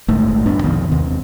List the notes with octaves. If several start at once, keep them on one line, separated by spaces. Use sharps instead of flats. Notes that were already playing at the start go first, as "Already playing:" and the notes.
D1 G1 G#2 A3
D1 G2 B3 D4
B1 F2 D#3
D#2 C3